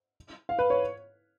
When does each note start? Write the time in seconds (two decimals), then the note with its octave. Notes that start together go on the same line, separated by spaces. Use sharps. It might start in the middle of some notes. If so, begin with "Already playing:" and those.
0.49 F5
0.59 B4
0.70 C#5